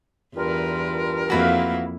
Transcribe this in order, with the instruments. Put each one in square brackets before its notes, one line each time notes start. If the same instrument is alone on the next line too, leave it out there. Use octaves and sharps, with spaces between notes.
[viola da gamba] E2 B4 [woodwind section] G2 F4 A#4
[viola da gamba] F2 A#3 E4 [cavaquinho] F#4 B4 F5